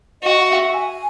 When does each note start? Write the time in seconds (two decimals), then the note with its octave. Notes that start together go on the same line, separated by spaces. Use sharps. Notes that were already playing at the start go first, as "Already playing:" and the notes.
0.22 F#4 D#5
0.41 F#5
0.48 E5
0.74 G#5